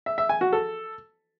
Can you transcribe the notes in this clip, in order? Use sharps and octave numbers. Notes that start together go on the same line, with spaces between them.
E5
E5
G#5
F#4
A4